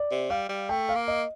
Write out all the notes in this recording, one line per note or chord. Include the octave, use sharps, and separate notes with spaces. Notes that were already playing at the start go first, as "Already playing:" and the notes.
Already playing: D5
C3
G3 F5
G3
A3 G5
F5
A#3
D#5